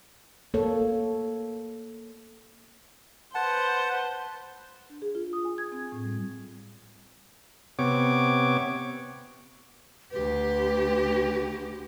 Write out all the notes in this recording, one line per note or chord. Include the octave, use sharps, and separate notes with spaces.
A#3 A4 C#5
B4 C5 F#5 A5
D4
G#4
F4
D#6
G#5
G#6
C4
A2
G3
C3 B3 C#5 D6
D2 G4 B4